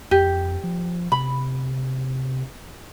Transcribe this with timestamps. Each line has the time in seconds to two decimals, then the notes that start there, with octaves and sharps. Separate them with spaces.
0.11 F2 G4
0.64 F3
1.12 C3 B5